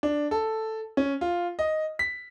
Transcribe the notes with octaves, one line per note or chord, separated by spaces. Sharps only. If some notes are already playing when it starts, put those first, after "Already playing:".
D4
A4
C#4
F4
D#5
B6